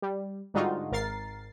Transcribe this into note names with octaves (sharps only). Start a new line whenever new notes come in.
G3
G#2 D3 G3 D#4 F4 F#4
G#1 A#4 A6 C7